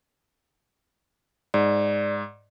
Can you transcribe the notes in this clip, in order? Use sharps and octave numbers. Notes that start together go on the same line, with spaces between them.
G#2 D5